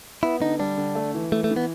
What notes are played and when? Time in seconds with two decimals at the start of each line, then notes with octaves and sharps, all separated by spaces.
0.23 B3 E4
0.42 D3 D#4
0.59 G3 D4
0.77 D3
0.95 A3
1.15 E3
1.32 E3 A3
1.44 A3
1.51 E3
1.56 B3